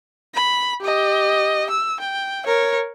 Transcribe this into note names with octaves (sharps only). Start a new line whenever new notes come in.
B5
G4 D#5
E6
G5
A#4 C#5